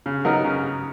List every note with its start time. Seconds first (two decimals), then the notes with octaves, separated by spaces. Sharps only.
0.06 C#3
0.25 F#3 B3 D#4 A#4
0.44 C#3